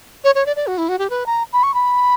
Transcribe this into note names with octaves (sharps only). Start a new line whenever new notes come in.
C#5
C#5
D5
D5
F#4
E4
F#4
G4
B4
A#5
B5
C#6
B5